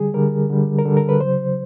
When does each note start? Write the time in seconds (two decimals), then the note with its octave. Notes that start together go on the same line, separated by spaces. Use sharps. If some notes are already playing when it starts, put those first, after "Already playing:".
Already playing: D3 G3 G#4
0.14 D3 G3 A#4
0.50 D3 G3
0.79 A#4
0.85 D3 G3 A4
0.97 A#4
1.09 B4
1.21 C#3 F#3 C5